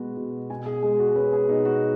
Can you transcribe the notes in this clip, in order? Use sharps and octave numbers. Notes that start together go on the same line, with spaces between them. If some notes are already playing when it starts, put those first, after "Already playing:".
Already playing: B2 G#3 B3 F#4
B2
B2 G#5
G#4
G#3 G#4
F#4
G#4
C#4 B4
G#4
B2 D#4
F#4